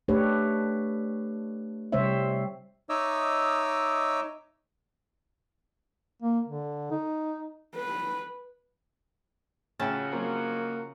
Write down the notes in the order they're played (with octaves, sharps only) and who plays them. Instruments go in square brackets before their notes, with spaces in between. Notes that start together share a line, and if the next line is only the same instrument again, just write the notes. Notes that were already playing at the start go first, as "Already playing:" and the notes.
[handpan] A3 D4 G4 A4 B4 C#5
C3 G3 C4 C5 C#5 E5
[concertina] D#4 C#5 D#5 E5 D6 E6
[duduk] A#3
D3
D#4
[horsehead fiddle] B4
[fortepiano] A2 G5 [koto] C#3 C#4 A5 [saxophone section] F3 F#4
[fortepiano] F#3 C4 [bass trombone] A#3